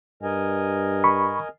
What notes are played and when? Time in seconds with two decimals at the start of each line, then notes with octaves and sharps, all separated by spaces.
0.23 G2 A#4 D#5 G#5
1.04 B5 C#6